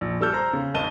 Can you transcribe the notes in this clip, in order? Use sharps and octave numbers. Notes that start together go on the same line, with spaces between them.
A#1
G3 A4 E6 F6 G6
C5 A#5
C#3
G#1 D#5 A5 D#7 G7